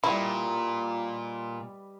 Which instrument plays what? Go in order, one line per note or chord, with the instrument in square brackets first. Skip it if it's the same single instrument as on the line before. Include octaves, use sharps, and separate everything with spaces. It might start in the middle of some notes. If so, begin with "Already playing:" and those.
[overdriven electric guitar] A#2 [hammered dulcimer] G3 B4 D#5 [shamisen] E4